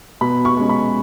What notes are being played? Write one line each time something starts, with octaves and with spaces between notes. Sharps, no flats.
B2 B5
C#6
G#3 C#4
B5